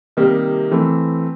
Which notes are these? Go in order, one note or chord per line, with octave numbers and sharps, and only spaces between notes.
C3 D#3 G3 A#3 D#4
E3 A3 C4